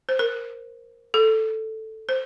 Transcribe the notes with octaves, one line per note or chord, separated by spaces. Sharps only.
C5
A#4
A4
C5